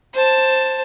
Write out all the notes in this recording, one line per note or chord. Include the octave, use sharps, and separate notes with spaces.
C5 A5